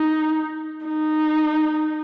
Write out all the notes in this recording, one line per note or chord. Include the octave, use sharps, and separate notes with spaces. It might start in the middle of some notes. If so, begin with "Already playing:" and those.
Already playing: D#4
D#4